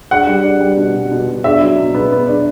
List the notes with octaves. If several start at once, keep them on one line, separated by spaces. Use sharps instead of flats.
D4 F#5
G3
D4
G3
B2
B2
B2
B2
D4 E5
F#3
B2
B3
B3
D4